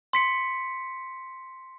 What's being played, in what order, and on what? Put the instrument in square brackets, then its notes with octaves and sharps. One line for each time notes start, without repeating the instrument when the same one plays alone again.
[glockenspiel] C6 B6 C#7